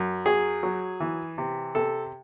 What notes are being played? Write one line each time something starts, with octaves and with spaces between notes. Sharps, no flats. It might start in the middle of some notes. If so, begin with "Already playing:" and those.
Already playing: F#2
F#3 G#4
F#3
E3
C3
C3 A4